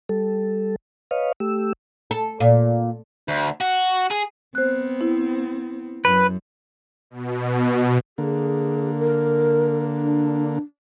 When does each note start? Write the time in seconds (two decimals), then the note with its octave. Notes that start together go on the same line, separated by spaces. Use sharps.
0.09 G3 A4
1.11 B4 C#5 D#5 F5
1.40 A3 G4 E6
2.11 A4
2.40 A#2
3.28 D2
3.61 F#4
4.11 G#4
4.55 B3 C4 C5 F#6
5.01 E4
6.05 F#2 B4
7.11 B2
8.18 D3 A#3 G#4
8.99 A#4
9.96 D4